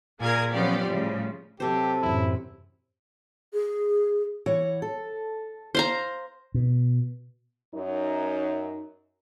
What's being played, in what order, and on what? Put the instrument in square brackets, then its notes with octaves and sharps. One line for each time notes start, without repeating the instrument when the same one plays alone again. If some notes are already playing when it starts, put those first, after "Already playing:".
[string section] A#2 A#3 G#4 A#4 G#6
F3 F#3 B3 C#4 G4 D5
A2 C#3 F3 G3
[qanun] C3 C5 [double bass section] F#3 [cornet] G4 [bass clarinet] A4
[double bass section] F#2 A2 E3 [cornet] E4
[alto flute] G#4
[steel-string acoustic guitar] E3 C#5 F#5
A4
[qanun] C5 F5 A#5
[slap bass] B2
[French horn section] F#2 D#4